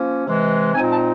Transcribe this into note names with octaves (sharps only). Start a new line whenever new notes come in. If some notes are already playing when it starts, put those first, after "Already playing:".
Already playing: F3 A#3 C#4
C3 E3 G#3
A#2 F3 G#3 C4 D#4 G#5
A5